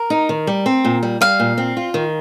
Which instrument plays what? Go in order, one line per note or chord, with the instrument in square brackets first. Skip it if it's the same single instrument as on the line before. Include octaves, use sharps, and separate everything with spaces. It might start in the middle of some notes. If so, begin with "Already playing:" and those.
Already playing: [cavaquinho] A#4
[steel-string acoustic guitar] D#4
D#3
G3
C4
A#2
G3
[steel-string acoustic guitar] G3 [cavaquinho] F5
[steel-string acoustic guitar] A#2
C4
F4
D#3